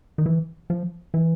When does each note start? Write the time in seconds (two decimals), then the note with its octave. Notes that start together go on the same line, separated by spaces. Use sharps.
0.18 D#3
0.26 E3
0.70 F3
1.14 E3